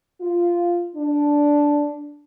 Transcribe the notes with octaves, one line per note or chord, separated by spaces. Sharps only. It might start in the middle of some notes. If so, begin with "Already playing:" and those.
F4
D4